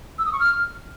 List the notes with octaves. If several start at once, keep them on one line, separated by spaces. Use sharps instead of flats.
E6
D#6
C#6
F6